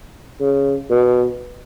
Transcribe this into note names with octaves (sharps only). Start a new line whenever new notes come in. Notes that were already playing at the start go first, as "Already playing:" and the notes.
C#3
B2